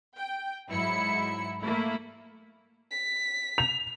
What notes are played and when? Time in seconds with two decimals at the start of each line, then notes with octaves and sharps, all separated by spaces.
0.17 G5
0.70 G#2 F#3 E4 C#7
1.64 A3 A#3 E4
2.91 B6
3.58 F7